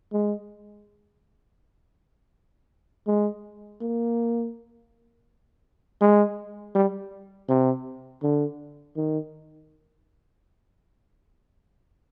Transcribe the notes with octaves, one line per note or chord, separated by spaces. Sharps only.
G#3
G#3
A#3
G#3
G3
C3
D3
D#3